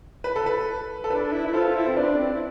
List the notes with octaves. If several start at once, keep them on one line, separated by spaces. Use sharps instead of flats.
B4
A4
B4
A4
D4 B4
E4
E4 B4
F4 A4 C5
E4
C4 C5
D4 B4 D5
C4
E4